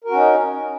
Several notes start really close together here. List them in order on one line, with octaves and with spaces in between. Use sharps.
A#4 F#4 C#4 D#4